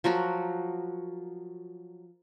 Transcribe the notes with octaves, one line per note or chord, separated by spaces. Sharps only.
F3 F#3 F#4 A#4